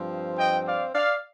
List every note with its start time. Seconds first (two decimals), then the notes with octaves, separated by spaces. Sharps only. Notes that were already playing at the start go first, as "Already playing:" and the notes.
Already playing: G2 F3 C4
0.38 D#5 G5
0.66 D5 F5
0.95 D5 F5